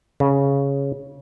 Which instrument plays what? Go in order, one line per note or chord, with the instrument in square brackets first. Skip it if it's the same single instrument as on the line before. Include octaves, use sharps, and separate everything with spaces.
[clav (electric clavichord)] C#3